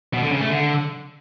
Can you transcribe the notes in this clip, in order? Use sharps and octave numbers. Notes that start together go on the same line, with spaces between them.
B2
D3
C#3
A3
D3